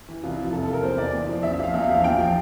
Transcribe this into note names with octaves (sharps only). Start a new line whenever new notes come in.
E3
C2 F4
E4
F3 F4
F1 A4
C3 A4
A#4
E2 C5
E3 D5
E2
F3
A1 E5
E5
F3 F5
E2 E5
F5
F3
F5
A#1 G5
F3